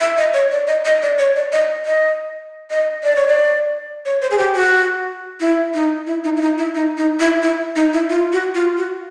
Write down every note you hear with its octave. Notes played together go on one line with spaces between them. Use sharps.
E5
D#5
C#5
D5
D#5
D#5
D5
C#5
D5
D#5
D#5
D#5
D5
C#5
D5
C#5
C5
G#4
G4
F#4
E4
D#4
E4
D#4
E4
D#4
E4
D#4
D#4
E4
E4
D#4
E4
F4
F#4
F4
F#4